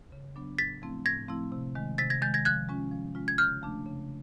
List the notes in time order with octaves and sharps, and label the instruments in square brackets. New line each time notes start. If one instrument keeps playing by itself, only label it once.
[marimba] C#3
F#3 B3 D4
[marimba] A2 [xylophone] A6 B6
[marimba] F3 A3 C4 E4
[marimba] A2 [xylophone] G#6 A#6
[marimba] F3 A3 C4 E4
C3
D#3 G#3
[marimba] C3 [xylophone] A6 B6
[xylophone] G#6 A#6
[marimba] D#3 G#3 [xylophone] G6 A6
[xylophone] G#6 A#6
[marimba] F3 [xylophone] F#6 G#6
[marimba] G#3 C#4 F4
F3
G#3 C#4 F4
[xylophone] G#6
[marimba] C#3 [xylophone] F6 G6
[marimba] F3 A3 D4
C#3